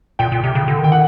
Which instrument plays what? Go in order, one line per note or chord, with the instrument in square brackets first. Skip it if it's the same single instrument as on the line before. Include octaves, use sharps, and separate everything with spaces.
[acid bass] A#2 [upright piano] G5
[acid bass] A#2
C3
C#3
D3
[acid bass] D#3 [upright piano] G5
[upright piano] F#5